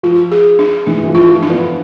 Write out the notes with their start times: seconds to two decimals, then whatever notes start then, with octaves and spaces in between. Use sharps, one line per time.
0.03 F3 F4
0.31 G#4
0.59 D4
0.86 E3 D4
1.03 E3
1.08 F3
1.15 F4
1.29 F3
1.43 D4
1.50 B3